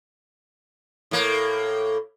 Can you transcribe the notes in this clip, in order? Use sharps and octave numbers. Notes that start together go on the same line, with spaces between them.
A2 A#3